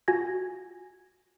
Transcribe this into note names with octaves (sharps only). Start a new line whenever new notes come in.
F4 F#4 G#5 G#6 A#6